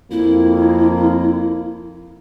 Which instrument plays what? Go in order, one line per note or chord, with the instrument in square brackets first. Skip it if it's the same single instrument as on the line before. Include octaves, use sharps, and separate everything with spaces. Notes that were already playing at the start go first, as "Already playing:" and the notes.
[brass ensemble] F2 A#3 [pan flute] E4